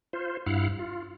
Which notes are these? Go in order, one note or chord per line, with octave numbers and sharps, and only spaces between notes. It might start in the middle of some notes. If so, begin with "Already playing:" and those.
F4 C5
G2 E4 F5 F#5
F4